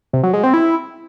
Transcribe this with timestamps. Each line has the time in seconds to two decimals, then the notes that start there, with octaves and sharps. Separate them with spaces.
0.13 C3
0.23 F#3
0.33 G#3
0.43 C4
0.54 E4